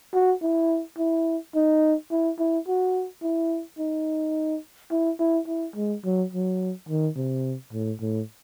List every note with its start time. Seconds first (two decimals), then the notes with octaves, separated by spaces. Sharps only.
0.14 F#4
0.42 E4
0.98 E4
1.55 D#4
2.11 E4
2.39 E4
2.67 F#4
3.22 E4
3.79 D#4
4.91 E4
5.20 E4
5.47 E4
5.76 G#3
6.05 F#3
6.33 F#3
6.89 D#3
7.16 C3
7.73 A2
8.01 A2